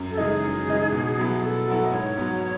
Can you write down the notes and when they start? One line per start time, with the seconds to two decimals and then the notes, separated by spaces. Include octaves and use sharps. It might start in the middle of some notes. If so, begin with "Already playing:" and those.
Already playing: F#2
0.11 A4
0.17 C#3 E3 G#3 D#4 G#4
0.43 F#2
0.68 C#3 E3 G#3 D#4
0.92 B2
1.18 F#3 B3 E4
1.33 G#4
1.42 B2 A4
1.67 F#3 B3 E4
1.85 D#5
1.92 G#2 C#5
2.17 F#3 B3